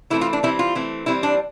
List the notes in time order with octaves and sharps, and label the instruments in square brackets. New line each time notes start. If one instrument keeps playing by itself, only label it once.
[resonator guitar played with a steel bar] E3 A3 C4 E4
F4
D4
E3 G3 C4 E4
F4
E3 A3 C4
E3 G3 C4 E4
D4